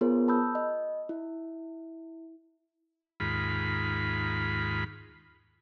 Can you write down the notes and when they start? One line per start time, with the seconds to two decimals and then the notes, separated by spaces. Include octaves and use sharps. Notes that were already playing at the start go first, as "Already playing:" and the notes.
0.01 B3 F4 G#4 A#4 C5 C#5
0.28 A5 B5 D#6 E6 G6
0.55 D#5
1.09 E4
3.20 D#2 G#2 F4 B5